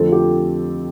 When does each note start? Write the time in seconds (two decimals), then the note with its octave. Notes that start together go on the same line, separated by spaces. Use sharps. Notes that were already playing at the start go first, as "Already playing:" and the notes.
Already playing: F2 D3 F3 A3 C4 A4
0.08 F4
0.12 G4